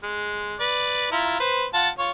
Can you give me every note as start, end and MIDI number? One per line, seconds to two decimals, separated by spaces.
0.03 0.55 56
0.60 1.07 71
0.60 1.07 74
1.12 1.39 64
1.12 1.39 65
1.12 1.39 82
1.40 1.65 71
1.40 1.65 72
1.74 1.89 65
1.74 1.89 78
1.74 1.89 81
1.98 2.11 65
1.98 2.11 73